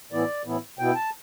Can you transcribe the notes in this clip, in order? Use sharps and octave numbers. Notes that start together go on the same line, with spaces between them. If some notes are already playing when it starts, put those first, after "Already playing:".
A2 E3 B3 E4 D5
A2 E3 B3 E4
B2 B3 E4 G5
A5